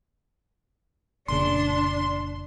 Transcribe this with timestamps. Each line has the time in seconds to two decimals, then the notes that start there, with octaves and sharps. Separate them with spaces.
1.28 F1 A#2 C#3 D4 C6